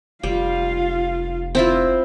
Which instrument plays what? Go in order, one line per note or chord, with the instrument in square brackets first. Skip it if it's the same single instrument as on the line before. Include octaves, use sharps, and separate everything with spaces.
[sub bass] F1 [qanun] G3 [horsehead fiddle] F4 F5
[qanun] C4 E4 F4